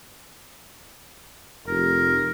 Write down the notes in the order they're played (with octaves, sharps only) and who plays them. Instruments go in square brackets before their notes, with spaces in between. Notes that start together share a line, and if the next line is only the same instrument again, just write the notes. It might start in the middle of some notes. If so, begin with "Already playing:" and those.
[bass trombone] F1 [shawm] A#4